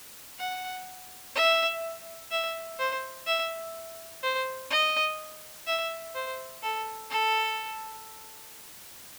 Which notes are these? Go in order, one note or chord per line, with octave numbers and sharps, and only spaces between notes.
F#5
E5
E5
C5
E5
C5
D#5
E5
C5
A4
A4